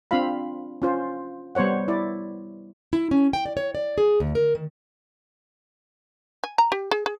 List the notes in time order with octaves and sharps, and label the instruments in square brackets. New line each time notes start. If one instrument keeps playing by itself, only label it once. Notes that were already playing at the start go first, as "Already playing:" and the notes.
[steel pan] C4 D4 F4 F5 B5
C#4 F4 C5
G3 B3 C5 C#5 F#5
E4 D5
[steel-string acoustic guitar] E4
C#4
G5
D5
C#5
D5
G#4
D2
A#4
D#3
[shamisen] G#5
A#5
G4
G#4
G#4